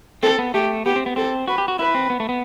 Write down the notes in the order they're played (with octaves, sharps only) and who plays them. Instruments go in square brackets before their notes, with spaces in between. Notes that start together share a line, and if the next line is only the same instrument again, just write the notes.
[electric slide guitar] C4 [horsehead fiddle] A4
[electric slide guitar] B3
[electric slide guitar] A3 [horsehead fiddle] G4
[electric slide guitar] B3 [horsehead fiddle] G4
[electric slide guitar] C4
B3
[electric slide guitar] C4 [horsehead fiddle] A4
[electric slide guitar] F#4 [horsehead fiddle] B4
[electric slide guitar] G4
F#4
[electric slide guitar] E4 [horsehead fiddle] B4
[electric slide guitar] C4
B3
A3
B3